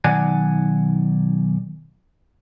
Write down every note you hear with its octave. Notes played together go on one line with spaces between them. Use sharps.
B1 D#3 D5 F#5 G#5